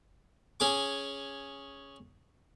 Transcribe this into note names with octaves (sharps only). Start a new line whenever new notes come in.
C#4 G#4 D6